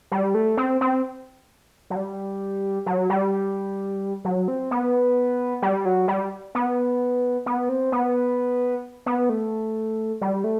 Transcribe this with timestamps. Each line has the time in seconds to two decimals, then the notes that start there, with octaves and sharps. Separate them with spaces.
0.12 G3
0.35 A3
0.57 C4
0.81 C4
1.90 F#3
1.96 G3
2.86 F#3
3.10 G3
4.25 F#3
4.48 C4
4.71 B3
5.62 G3
5.85 F#3
6.08 G3
6.55 B3
7.46 B3
7.69 C4
7.92 B3
9.06 B3
9.29 A3
10.21 G3
10.44 A3